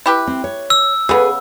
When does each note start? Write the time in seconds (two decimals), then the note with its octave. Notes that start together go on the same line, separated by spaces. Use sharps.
0.06 E4 G4 B4
0.27 C4
0.44 C#5
0.70 E6
1.09 C#3 B3 G#4 A4 B4